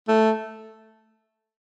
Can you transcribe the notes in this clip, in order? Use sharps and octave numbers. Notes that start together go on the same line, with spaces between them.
A3